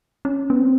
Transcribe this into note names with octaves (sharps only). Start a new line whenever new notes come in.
C#4
B3
C4